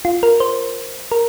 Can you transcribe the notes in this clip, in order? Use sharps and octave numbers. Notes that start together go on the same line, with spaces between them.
F4
A#4
C5
A#4